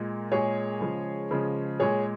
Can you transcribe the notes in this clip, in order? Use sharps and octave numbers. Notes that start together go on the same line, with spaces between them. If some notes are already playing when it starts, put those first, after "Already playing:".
Already playing: A#2 G#3
A#2 G#3 G#4 C#5
C#3 F3 G#3
C#3 F3 G#3
A#2 G#3 G#4 C#5